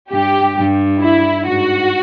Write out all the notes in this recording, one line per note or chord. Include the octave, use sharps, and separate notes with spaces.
G2 G4
G2
E4
G#2 F#4